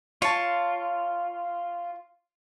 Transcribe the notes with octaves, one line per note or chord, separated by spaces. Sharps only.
F4 C#5 A5